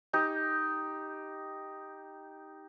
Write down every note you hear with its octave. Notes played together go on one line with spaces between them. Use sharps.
D#4 G4